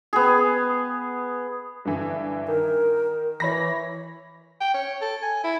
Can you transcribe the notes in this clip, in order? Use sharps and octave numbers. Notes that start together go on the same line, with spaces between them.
B3 G#4
G2 D3 E3
D#3 A#4
E3 C#5 B5 A#6
G5
C#5
A4
G#5
E4